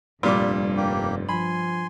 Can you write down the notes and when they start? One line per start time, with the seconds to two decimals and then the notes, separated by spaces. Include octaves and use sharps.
0.23 F1 G2 A#2 G3 D6
0.77 A#3 G4
1.29 F3 G#5 B5 C6